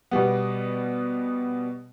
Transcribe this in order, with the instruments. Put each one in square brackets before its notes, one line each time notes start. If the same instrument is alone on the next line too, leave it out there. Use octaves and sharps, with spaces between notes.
[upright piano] B2 G3 B3